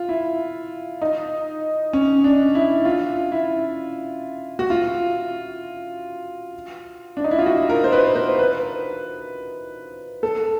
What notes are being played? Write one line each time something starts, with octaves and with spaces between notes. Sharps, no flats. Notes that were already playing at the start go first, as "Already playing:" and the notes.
Already playing: F4
E4
D#4
C#4
D4
E4
F4
E4
F#4
F4
D4
D#4
E4
F4
F#4
A#4
C5
B4
C5
B4
A4